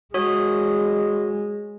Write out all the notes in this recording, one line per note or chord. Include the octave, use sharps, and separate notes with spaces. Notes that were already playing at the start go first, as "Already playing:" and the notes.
G#3 F#4 C#5 D#6